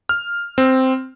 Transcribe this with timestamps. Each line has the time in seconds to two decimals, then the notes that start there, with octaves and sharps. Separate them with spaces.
0.09 F6
0.58 C4